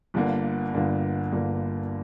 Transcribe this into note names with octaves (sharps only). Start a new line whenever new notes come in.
G1 G2 D3 A#3
G1 G2 D3 A#3
G1 G2 D3 A#3